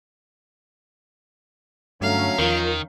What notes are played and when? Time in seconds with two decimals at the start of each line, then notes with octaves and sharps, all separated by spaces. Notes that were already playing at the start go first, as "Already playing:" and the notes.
2.01 G2 D3 F#3 A3 C#4 F5 A#5
2.39 E2 D#3 F3 F4 A#4